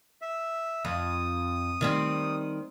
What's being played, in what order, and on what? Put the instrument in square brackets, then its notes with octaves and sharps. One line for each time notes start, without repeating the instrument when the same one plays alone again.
[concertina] E5
[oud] F2 [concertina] D#6
[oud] D#3 G3 C4